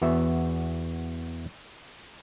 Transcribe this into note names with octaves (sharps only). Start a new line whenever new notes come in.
E2 B3 F#4 E5